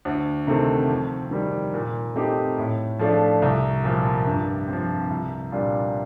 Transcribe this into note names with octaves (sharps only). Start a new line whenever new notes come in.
D2
C3 D#3 A3 C4
F2
D#3 G3
A#2
A3 C4 D#4 G4
A2
F3 A3 D4 F4
C2
A#2 F3 A#3
G2
C4
F3
C2
A#2 G3 D4 F4